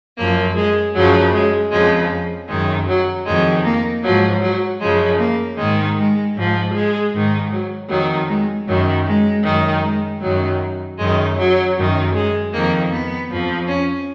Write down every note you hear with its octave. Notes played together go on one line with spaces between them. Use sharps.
F#2 F3 A#3
G#3
F#2 C#3 F3 F#3
G#3
F2 C#3 F3 G#3
F#2 D#3 G#3
F#3
F2 D#3 G#3
A#3
G#2 F3 F#3
F#3
F#2 C#3 F3 G#3
A#3
G#2 D#3 G#3
G#3
G#2 F3
G#3
G#2 D#3
F#3
F2 D#3 F#3
G#3
F#2 D#3 F#3
G#3
F#2 D#3
G#3
F#2 D#3 F#3
F#2 D#3 G#3
F#3
F#2 D#3
G#3
F2 D#3 A#3
B3
F2 F3
C#4